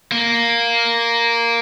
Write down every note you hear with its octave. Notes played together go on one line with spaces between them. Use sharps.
A#3